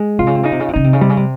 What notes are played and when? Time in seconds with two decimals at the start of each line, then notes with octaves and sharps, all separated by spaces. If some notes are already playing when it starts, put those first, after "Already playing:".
Already playing: G#3
0.19 C3 F4
0.27 C#3
0.35 C3
0.43 C#3 D#4
0.52 C3
0.60 C#3
0.68 C3
0.74 C#3 D#4
0.84 C3
0.93 C#3
1.01 C3 G3
1.09 C#3
1.17 C3